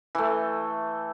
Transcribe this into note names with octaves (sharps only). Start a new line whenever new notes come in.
E3 A3